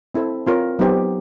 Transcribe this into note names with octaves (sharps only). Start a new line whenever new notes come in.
C4 E4 A4 C5
C4 F4 A#4 C#5
F#3 B3 D#4 G4 C5